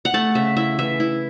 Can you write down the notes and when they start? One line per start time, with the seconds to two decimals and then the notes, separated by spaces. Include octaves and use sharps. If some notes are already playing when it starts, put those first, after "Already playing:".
0.05 F#5
0.14 A3 A5
0.35 C#3 E5
0.57 E4 E5
0.78 E3 E5
1.00 E4